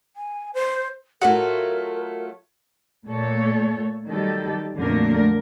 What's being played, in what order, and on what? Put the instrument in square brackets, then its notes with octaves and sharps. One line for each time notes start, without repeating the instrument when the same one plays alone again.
[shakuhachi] G#5
C5
[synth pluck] A2 F#5 [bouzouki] F#3 A3 F4 [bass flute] A#4
[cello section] A#2 A3 A4 C#5
D#3 F#3 G3 G4 A4
F2 A#2 D3 F#3 A3 A#4